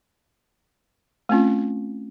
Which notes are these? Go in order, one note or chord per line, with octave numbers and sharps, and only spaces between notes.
A3 C4 C#4 F4